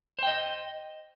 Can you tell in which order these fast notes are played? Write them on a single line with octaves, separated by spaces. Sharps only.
C5 G5 D#5